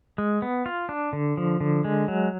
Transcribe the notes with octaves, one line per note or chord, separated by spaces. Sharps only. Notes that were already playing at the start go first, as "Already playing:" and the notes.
G#3
B3
F4
D4
D3
F3
D3
G#3
F#3